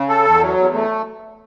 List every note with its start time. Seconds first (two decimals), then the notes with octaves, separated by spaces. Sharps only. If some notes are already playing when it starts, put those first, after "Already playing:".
Already playing: C#3
0.09 A4
0.25 E2
0.41 F#3
0.57 E2
0.74 A3